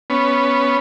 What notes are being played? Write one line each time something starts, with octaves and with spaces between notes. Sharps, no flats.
B3 C#4